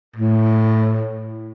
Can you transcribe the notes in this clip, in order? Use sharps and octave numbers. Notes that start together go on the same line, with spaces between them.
A2